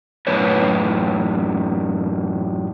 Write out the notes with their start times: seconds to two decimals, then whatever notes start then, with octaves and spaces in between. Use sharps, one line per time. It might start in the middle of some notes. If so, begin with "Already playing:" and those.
0.27 F#2 A2 B4 C#5